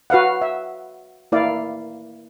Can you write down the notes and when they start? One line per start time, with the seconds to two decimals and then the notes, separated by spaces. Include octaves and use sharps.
0.10 F#4 B4 F5 F#5
0.42 E5
1.32 A#3 E4 D5 F5